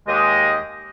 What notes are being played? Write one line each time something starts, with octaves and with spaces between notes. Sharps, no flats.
D#2 G#3 G4 D#5